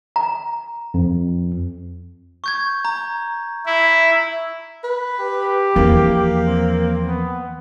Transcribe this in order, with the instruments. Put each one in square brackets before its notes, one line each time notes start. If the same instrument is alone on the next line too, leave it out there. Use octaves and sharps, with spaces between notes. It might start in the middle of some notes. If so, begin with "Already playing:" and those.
[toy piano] A#5
[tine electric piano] F2
[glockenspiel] C#6 G6 G#6
A#5
[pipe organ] E4
[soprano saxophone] B4
[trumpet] G4
[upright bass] E2 F3 [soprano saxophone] A#3
[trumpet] C4
B3